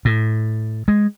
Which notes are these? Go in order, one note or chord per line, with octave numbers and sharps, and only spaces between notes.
A2
G#3